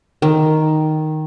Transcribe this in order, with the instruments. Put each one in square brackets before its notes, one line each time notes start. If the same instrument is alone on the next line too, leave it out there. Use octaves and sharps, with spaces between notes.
[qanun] D#3